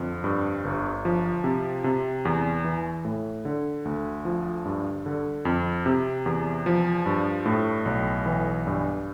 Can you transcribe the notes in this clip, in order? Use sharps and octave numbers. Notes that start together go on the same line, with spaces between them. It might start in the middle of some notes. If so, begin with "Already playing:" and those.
Already playing: F2 D3
G2
G1
F3
C3
C3
E2
E3
A2
D3
D2
F3
G2
D3
F2
C3
E2
F3
G2
A2
B1
E3
G2